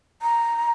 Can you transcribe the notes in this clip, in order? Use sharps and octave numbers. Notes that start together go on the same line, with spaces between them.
A#5